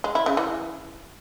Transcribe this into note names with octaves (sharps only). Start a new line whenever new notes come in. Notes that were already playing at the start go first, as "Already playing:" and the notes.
G#3
E4
C#3
E3